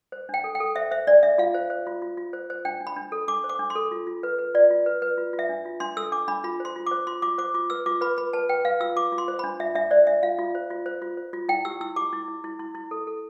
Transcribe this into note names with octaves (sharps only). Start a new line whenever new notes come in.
C5
D4 G5
A4
G5
A4
C5 E5
C5 E5
D4 D5
D4 E5
F4 F5
C5
C5
F4
F4
F4
C5
C5
D4 G5
D4
B5
D4
A4
D4 D6
C5
D6
D4
C6
A4
F4
F4
B4
B4
F4 D5
F4
B4
B4
F4
F4
E5
D4
F4
D4 C6
A4 E6
D4 D6
D4 B5
F4 B5
C5 C6
F4
C5 D6
F4 C6
F4 D6
C5 D6
F4 D6
B4 E6
F4 D6
B4 B5
B4 B5
B4 A5
B4 G5
B4 F5
F4 E6
F4 D6
F4
C6
C5
D4 B5
F4 E5
D4 E5
C5 D5
D4 E5
F4 F5
F4
C5
F4
C5
F4
C5
F4
E4 G5
G4 E6
E4 E6
G4 D6
E4
E4
E4
E4
E4
A4
A4